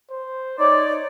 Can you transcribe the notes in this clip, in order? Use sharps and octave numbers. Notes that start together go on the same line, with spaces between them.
C5
D#4 C#5 D5